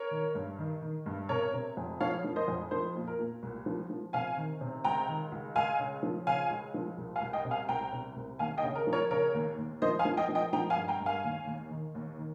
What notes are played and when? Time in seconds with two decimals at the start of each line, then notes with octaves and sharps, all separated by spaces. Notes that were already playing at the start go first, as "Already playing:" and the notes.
Already playing: A#4 C#5
0.11 D#3
0.35 G2
0.59 D#3
0.82 D#3
1.06 G2
1.29 C3 A#4 C#5
1.53 C3
1.77 F2
2.01 F3 C#5 F5
2.24 F3
2.36 C5 D#5
2.48 F2
2.71 F3 C5
2.95 A#2
3.07 A#4
3.19 A#2
3.43 C2
3.66 F3
3.90 F3
4.13 C3 F5 G#5
4.37 D#3
4.61 C3
4.84 C#2 G5 A#5
5.08 D#3
5.32 C#2
5.56 C#2 F5 G#5
5.79 C#3
6.03 F3
6.26 C#3 F5 G#5
6.50 C#2
6.74 F3
6.98 C2
7.16 F5 G#5
7.22 C2
7.33 D#5 G5
7.45 C3
7.51 F5 G#5
7.69 C2 G5 A#5
7.93 C3
8.16 C2
8.39 D#2 F5 G#5
8.58 D#5 G5
8.63 C#3
8.75 A#4
8.87 F3
8.93 A#4 C#5
9.11 C#3 A#4 C#5
9.34 D#2
9.58 D#2
9.82 F3 C5 D#5
9.99 F5 G#5
10.05 F3
10.17 D#5 G5
10.29 F3
10.35 D#5 G5
10.53 F3 G5 A#5
10.70 F5 G#5
10.76 G2
10.88 G5 A#5
11.00 G2
11.06 F5 G#5
11.24 D#2
11.47 D#2
11.71 D#3
11.95 D#2
12.18 D#3